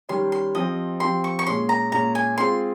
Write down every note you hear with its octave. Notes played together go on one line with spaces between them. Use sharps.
D#3 G3 C#4 G4 C6
C6
F3 C4 G4 D#5
F3 C4 G4 C6
C#6
C#6
A#2 G#3 C#4 C6
A#5
A#2 G#3 C#4 A#5
G#5
G#3 C4 F4 G#4 C6